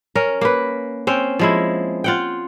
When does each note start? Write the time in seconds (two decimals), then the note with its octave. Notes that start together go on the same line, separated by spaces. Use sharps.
0.15 C#4 A#4
0.41 A#3 B4
1.07 C4 C#4 G5
1.39 F3 G#3 E4
2.04 F4 F#5 G5